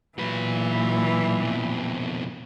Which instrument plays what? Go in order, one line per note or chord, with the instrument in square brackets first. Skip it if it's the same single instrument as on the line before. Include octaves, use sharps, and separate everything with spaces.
[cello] A#2 E3 [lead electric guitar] F#3 B4
[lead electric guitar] F2 B2